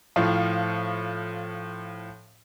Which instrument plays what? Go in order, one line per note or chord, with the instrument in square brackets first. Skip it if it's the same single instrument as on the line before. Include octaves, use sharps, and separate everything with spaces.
[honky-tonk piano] A2 F3 F5